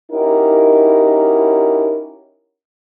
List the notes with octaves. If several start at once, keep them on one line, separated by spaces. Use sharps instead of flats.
C#4 D#4 E4 F#4 G4 A#4